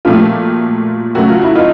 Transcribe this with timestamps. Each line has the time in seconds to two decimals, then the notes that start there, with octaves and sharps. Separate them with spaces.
0.05 A#2 F3 A3 F4 G4
1.15 C#3 F#3 A3 F#4
1.29 F4
1.42 E4
1.55 D#4 F4